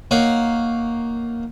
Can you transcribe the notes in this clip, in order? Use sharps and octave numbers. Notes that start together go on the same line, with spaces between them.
A#3 D#4 C#5 F5 F#5